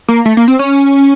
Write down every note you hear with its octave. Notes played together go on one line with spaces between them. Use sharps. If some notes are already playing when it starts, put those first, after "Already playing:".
A#3
A3
A#3
C4
C#4